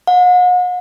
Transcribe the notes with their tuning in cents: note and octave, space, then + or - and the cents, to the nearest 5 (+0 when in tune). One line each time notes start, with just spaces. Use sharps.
F#5 -40